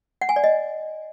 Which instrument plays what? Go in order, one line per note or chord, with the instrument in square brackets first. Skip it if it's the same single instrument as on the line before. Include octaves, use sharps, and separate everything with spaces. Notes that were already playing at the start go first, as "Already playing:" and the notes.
[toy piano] F#5
G#5
D5
D#5